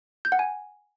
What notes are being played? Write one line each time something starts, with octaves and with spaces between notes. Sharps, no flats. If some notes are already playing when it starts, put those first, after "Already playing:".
G6
F#5
G#5